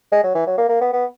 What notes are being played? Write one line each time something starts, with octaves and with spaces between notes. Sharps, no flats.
G#3
F#3
E3
F#3
A#3
A#3
B3
B3